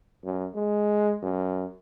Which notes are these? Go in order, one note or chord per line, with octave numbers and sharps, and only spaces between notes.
F#2
G#3
F#2